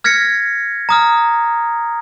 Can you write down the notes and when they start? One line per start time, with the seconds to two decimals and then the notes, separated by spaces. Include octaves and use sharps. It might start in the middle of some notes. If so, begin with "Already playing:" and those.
0.04 F6 G#6 A#6 B6 C#7
0.89 A#5 D#6 F6